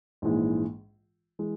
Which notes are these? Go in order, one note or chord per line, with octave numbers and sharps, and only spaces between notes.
A#1 G#2 E3 G#3
E3 G#3